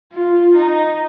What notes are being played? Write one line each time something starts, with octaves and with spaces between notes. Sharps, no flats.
F4
D#4